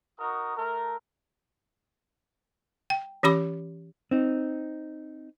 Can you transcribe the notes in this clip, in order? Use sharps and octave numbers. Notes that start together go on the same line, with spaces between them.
D#4 F#4 A#4 D#6
A3 A#4
G5
E3 C#4 G4 B5 D6
C4 D#4